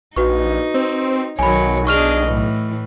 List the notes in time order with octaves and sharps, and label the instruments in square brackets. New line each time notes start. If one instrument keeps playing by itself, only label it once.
[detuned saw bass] A#1 [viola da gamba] D#4 [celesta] F#4 B4 C#6
[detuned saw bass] C4
[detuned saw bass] B1 [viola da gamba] D#3 F#3 C#5 [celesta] G#5 B5
[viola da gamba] D4 G#4 D#5 [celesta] C#6 F6 F7
[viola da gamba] A2 E3